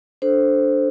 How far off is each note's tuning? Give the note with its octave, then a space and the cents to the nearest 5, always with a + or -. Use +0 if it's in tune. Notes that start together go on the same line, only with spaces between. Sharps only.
D4 +0 A4 +0 C5 +0